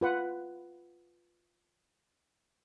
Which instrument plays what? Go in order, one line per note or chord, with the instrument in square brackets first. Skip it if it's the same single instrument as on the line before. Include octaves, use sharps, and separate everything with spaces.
[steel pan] F4 B4 F#5